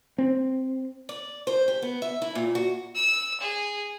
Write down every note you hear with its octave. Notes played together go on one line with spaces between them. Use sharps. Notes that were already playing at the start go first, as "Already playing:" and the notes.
C4
D5
C5
G4
B3
E5
E4
A#2
F#4
E6
G#4